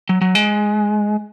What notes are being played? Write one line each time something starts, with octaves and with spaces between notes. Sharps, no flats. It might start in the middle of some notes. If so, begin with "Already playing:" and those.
F#3
F#3
G#3